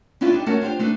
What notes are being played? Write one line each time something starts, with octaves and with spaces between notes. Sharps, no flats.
C#4 D4 E4 F4 B4
D4 D#4 G4
A3 C#4 F#4 A#4 F#5 A5
D4 F4 G4 C5
A3 D4 D#4 B4